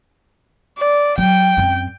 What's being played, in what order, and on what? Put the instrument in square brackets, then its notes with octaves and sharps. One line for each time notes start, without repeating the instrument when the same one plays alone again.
[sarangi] D5
[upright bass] F#3 [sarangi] G5
[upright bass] F#2 C4